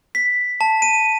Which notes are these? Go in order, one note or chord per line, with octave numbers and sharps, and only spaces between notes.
B6
A5
D#7